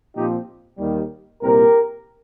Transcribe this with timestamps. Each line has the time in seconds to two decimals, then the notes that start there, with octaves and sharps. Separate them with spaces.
0.15 A#2 F3 C4 D#4 G4
0.78 D#2 D#3 G3
1.42 C2 A#2 G3 C4 G4 A#4